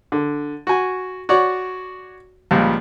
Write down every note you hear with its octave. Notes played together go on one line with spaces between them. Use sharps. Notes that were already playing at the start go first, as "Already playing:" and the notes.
D3
F#4 G#5
F#4 C#5 D5
C#2 A#2 F3 G3